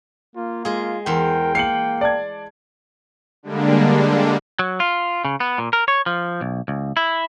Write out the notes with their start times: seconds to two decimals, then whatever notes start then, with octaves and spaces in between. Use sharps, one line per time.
0.36 A#3 F4
0.65 G#3 F4 G#4
1.06 E2 A#4 C5 G5
1.55 A#3 F5 C7 C#7 F#7
2.01 D5 A5 G#6
3.43 D3 G3 G#3 A#3 D4
4.59 F#3
4.80 F4
5.25 C#3
5.40 B3
5.58 A#2
5.73 A#4
5.88 C#5
6.06 F3
6.41 B1
6.68 C#2
6.97 E4